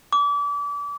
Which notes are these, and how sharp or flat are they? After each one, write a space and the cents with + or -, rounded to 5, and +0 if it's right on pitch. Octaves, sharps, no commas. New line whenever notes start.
D6 -35